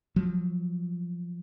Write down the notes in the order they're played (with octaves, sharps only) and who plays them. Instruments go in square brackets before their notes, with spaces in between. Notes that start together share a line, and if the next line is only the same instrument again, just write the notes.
[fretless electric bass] F3 F#3